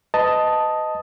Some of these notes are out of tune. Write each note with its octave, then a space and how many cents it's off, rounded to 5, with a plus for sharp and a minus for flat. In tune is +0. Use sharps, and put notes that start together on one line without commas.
B4 +30 D#5 +5 A5 +0